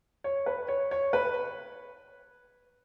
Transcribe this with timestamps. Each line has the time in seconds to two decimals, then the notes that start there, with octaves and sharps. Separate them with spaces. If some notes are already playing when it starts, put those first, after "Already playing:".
0.24 C#5
0.46 B4
0.68 C#5
0.91 C#5
1.13 B4